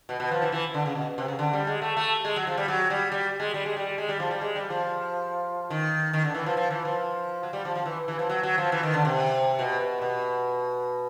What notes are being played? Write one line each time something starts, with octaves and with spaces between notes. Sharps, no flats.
B2
B2
F3
E3
E3
D3
C#3
B2
C3
C#3
D3
G3
G#3
A3
A3
G#3
F#3
F3
G3
F#3
G3
G3
G#3
G3
G#3
G3
G#3
G3
F3
G3
G#3
G3
F3
D#3
D#3
D3
E3
F3
F3
E3
F3
F#3
G3
F3
F3
E3
E3
F3
F#3
F#3
F3
E3
D#3
D3
C3
B2
B2
A#2
B2